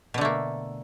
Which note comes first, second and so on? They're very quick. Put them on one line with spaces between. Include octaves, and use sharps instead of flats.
B2 D3 A3 A#3